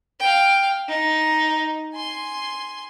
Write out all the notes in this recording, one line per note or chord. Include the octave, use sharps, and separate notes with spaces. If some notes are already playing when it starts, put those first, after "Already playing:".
F5 G5
D#4
G#5 C6